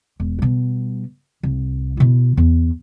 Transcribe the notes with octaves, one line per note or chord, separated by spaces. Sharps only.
E1
B2 G3
C2
B2 E4
E2